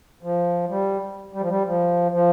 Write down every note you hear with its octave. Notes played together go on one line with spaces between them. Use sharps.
F3
G3
G3
F3
G3
F3
F3